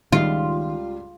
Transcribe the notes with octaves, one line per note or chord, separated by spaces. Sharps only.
C#2 D#3 G3 F4